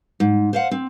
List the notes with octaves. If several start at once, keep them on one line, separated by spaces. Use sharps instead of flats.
G#2
C5 F5 F#5
C4